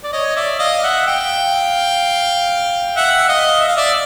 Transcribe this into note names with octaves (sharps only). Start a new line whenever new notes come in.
D5
C#5 D#5
D5 E5
D#5 F5
E5 F#5
F5 G5
E5 F#5
D#5 F5
E5
F5
D5 E5